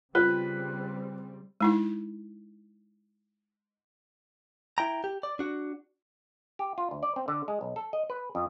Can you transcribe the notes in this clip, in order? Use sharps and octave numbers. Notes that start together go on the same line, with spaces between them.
C#3 G3 C4 F4 B4
G#3 D#4 E4
E4 G5 A#5
G4
D5
D4 F#4
G4
F4
D2
D5
C4
D3
G#3
B1
A4
D#5
B4
F2